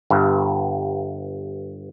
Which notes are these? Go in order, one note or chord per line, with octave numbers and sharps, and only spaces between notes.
G1 G2